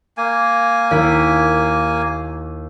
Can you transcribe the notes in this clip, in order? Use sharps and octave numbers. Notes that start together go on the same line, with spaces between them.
A#3 G#5
D#2 E4 B6